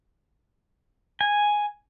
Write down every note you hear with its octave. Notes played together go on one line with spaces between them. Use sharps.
G#5